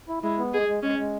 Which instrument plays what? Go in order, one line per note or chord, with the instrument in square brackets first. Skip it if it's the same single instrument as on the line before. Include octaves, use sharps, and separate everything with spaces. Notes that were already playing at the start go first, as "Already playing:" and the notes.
[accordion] E4
[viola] G#3 [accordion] E4
[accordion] B3
[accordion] G#3 [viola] G#4
[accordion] G#3
[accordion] G#3 [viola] C#4
[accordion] G#3